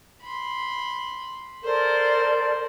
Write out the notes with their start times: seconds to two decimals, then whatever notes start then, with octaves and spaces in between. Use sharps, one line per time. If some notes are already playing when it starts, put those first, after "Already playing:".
0.23 B5 C6
1.64 A4 A#4 C5 D5